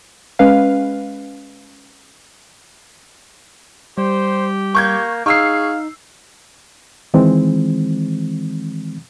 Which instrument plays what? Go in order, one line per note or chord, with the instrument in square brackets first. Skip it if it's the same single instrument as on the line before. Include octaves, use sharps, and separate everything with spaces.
[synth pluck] G#3 C#4 B4 F5
[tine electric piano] G3 [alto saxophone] G4 [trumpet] C5
[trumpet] A#3 [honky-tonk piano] C#6 G6 G#6
[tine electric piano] D#4 [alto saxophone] G#4 [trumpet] F5 [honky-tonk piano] C#6 E6 C7
[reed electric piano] D#3 E3 G#3 C4